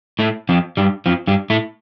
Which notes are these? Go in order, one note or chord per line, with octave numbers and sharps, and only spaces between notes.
A2 A3
F2 F3
G2 G3
F2 F3
G2 G3
A2 A3